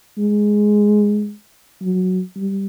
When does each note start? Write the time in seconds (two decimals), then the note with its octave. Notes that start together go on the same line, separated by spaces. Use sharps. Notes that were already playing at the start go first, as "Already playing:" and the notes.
0.18 G#3
1.82 F#3
2.36 G3